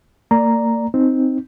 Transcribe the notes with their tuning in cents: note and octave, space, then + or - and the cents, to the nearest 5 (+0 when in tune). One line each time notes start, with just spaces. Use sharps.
A#3 -35 D5 +0 A#5 +0
C4 +0 D#4 +0